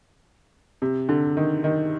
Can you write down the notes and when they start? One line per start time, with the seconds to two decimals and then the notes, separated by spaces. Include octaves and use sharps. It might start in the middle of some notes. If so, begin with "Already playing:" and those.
0.82 C3
1.09 D3
1.37 D#3
1.64 D#3